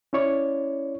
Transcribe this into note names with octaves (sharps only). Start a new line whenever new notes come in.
C#4 E4 C#5 D5